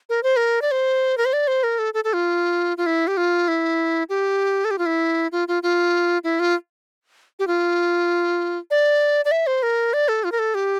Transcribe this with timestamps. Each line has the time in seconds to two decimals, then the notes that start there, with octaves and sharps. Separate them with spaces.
0.09 A#4
0.23 C5
0.37 A#4
0.62 D5
0.71 C5
1.18 A#4
1.25 C5
1.33 D5
1.47 C5
1.63 A#4
1.79 A4
1.94 A4
2.04 A4
2.14 F4
2.77 F4
2.86 E4
3.07 G4
3.17 F4
3.48 E4
4.09 G4
4.65 A4
4.71 G4
4.78 F4
4.86 E4
5.32 F4
5.48 F4
5.63 F4
6.24 E4
6.40 F4
7.39 G4
7.47 F4
8.71 D5
9.25 D5
9.31 E5
9.47 C5
9.63 A#4
9.93 D5
10.08 A4
10.24 F4
10.32 A#4
10.39 A4
10.55 G4